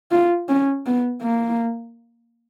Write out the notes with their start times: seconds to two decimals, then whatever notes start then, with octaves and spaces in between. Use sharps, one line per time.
0.12 F4
0.49 C#4
0.86 B3
1.22 A#3